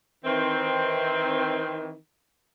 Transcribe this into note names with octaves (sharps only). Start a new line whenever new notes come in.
D#3 E3 C4